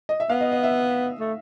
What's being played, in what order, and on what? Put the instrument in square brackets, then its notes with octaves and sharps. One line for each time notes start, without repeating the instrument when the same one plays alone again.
[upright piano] D#5
E5
[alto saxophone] B3 [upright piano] F5
[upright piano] D#5
D#5
E5
[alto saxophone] A3